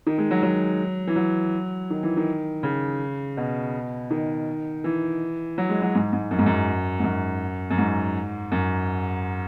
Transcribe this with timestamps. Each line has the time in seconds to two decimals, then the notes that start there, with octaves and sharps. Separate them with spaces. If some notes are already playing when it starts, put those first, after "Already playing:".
0.06 D#3
0.18 G#3
0.31 F#3
0.43 F#3
1.07 E3
1.16 F#3
1.90 D#3
2.03 E3
2.17 D#3
2.63 C#3
3.37 B2
4.11 D#3
4.84 E3
5.58 F#3
5.69 G#3
5.82 F#3
5.95 G#2
6.13 G#2
6.31 F#2
6.39 G#2
6.46 F#2
6.99 G#2
7.04 F#2
7.71 F#2
7.78 G#2
8.52 F#2